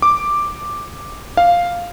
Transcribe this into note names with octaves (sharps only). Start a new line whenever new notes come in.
D6
F5